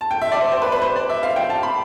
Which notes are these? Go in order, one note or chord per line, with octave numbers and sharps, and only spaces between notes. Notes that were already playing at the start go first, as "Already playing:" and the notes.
A5
G5
E5
D5
C5
C5
B4
B4
C5
D5
E5
F5
G5
A5
B5